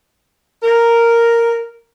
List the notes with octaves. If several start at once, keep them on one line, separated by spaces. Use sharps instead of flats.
A#4